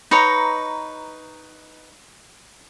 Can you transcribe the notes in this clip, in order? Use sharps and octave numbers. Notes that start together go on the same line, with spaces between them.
D#4 B4 C#5 A#5